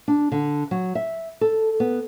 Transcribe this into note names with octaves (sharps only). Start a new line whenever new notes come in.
D4
D3
F#3
E5
A4
B3